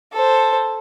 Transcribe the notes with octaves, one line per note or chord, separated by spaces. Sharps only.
A4 C5